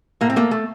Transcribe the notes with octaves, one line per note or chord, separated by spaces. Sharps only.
A2 A#3
C4
A3 A#3
A3